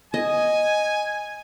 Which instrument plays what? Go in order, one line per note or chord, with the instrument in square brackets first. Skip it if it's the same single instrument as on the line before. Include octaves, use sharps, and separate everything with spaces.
[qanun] D#5 [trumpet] G#5